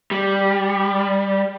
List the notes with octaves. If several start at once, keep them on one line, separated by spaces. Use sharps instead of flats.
G3